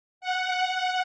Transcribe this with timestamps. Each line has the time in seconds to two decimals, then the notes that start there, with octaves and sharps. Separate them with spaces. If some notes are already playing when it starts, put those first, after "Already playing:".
0.21 F#5